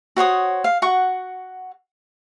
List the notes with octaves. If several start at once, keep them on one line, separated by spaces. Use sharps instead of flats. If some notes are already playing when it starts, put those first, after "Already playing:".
F#4 C5 C#5 D#6
F5
F#4 F#5 C#6